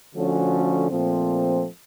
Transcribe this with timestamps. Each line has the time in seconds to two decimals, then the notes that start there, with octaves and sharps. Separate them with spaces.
0.13 D3 F3 A3 C#4 F#4
0.89 A#2 F3 A3 C4